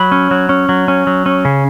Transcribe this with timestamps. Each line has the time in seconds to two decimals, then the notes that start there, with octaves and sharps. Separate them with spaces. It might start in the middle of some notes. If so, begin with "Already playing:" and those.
Already playing: F#3 B5
0.12 C#4
0.31 F#3
0.49 C#4
0.69 F#3
0.88 C#4
1.07 F#3
1.26 C#4
1.45 C#3